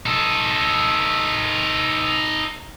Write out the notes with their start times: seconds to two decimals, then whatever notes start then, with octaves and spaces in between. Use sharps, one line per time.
0.06 D#4 A4